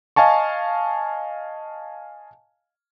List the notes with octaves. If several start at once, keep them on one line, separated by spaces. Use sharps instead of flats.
D#5 F5 G#5 A5 C#6